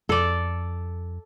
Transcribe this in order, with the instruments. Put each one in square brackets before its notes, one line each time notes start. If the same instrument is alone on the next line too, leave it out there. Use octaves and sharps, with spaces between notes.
[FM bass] F2 [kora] A4 D5